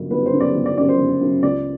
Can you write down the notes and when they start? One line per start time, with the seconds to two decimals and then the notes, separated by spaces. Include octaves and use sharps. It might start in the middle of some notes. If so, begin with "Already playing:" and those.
Already playing: G1 F#2 C#3
0.11 G1 B4
0.26 C5
0.33 F#2 C#3
0.40 D5
0.55 G1
0.66 D5
0.77 F#2 C#3 D5
0.89 C5
0.99 G1
1.21 F#2 C#3
1.43 C#2 D5